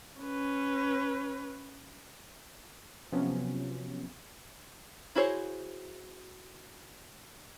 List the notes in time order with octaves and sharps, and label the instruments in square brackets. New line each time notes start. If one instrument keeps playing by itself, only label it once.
[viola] C#4 B4
[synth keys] C3 F3 F#3 B3 C#4
[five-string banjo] E4 F#4 G#4 C5 C#5